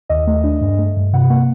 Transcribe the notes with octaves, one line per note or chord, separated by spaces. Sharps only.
D#2 D#5
A3
D4
G2
A3
G2
C3 F#5
A#3 F#5